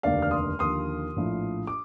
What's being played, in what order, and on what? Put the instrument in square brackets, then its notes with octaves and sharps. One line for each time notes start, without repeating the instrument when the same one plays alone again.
[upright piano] F1 D#2 D3 D5 F5
F6
C6 D#6
D#2 D3 F3 C6 D#6
A#1 A2 F3
D6